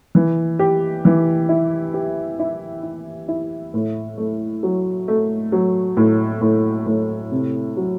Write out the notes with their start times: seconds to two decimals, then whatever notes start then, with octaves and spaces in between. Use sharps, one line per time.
0.15 E3
0.59 G4
1.05 E3
1.49 E4
1.94 G4
2.39 E4
2.83 E4
3.28 E4
3.74 A2
4.17 A3
4.63 F#3
5.08 A3
5.52 F#3
5.97 A2
6.41 A2
6.86 A2
7.32 C3
7.77 F#3